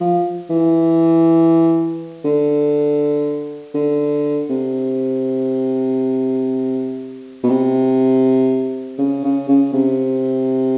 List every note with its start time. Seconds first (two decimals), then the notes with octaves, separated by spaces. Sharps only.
0.01 F3
0.50 E3
2.25 D3
3.75 D3
4.50 C3
7.44 B2
7.49 C3
8.99 C#3
9.24 C#3
9.49 C#3
9.73 C3